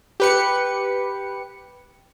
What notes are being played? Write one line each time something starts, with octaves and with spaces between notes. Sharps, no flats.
G4 B4 C#7